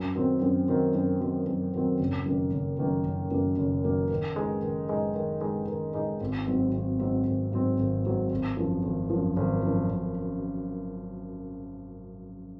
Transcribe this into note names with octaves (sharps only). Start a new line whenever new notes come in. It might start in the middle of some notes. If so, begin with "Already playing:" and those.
Already playing: F#2
D#3 F#3 C4
F#2
D#3 F#3 C4
F#2
D#3 F#3 C4
F#2
D#3 F#3 C4
F#1
F#2 D#3 A#3
F#1
F#2 D#3 A#3
F#1
F#2 D#3 A#3
F#1
F#2 D#3 A#3
D#3
G#3 D#4
D#3
G#3 D#4
D#3
G#3 D#4
D#3
G#3 D#4
G#1
G#2 F#3 C4
G#1
G#2 F#3 C4
G#1
G#2 F#3 C4
G#1
G#2 F#3 C4
G#1
F#2 F3
G#1
F#2 F3
G#1
F#2 F3
G#1